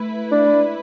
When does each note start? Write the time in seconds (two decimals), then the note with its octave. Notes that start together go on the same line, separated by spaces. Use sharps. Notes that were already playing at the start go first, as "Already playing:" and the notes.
Already playing: A3 E4 B4
0.32 D4